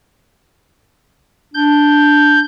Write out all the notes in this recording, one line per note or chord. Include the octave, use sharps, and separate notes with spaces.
D4 G6